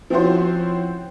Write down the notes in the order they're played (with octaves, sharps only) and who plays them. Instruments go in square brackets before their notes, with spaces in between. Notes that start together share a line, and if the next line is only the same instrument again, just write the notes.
[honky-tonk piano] F3 C4 C#4 E4 F#4 C5